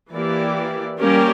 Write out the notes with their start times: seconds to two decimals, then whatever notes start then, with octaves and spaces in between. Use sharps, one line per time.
0.12 E3 A#3 E4 G4 D5
1.00 G3 A#3 C#4 G4 A#4